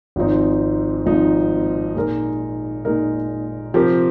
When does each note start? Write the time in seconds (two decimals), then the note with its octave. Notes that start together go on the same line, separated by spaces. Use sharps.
0.16 G#1 G#2 F3 C4 D#4
1.06 G#1 G#2 F3 C4 D#4
1.95 A#2 G#3 D#4 A#4
2.85 A#2 G#3 D#4 A#4
3.74 C3 F3 C4 G4 A#4